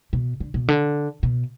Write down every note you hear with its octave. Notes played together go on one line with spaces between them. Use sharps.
B2
D3
B2
D3
B2